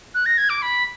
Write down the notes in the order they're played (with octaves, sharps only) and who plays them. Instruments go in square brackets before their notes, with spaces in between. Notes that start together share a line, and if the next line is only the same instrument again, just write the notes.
[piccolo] F#6
A#6
G#6
D6
B5